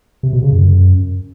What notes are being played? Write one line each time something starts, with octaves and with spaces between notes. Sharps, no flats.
C3
B2
C#3
F#2